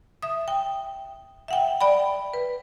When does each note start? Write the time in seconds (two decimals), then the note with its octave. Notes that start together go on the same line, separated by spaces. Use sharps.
0.22 E5 D#6
0.48 G5
1.48 E5 F#5 G5
1.81 D5 G5 B5
2.34 B4